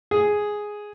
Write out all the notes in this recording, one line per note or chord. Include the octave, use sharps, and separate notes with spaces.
G#4